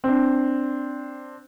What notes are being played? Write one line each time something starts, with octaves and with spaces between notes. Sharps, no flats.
C4 D4